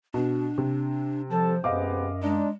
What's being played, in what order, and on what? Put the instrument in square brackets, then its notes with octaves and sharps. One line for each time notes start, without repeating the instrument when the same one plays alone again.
[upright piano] B2 [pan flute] D4
[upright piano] C3
[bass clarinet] F3 [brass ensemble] G3 A4 A5 [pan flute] C5
[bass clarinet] F#2 [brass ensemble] C3 G#3 B3 [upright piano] D#5 F5 D6
[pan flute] G#3 [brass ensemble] D4 D#4